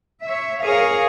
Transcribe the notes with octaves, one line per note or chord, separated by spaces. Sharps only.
C#5 E5
G#4 A#4 C#5 F5